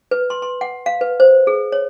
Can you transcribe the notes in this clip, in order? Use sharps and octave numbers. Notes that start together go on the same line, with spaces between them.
B4
C6
C6
F#5
F5
B4
C5
G#4
C#5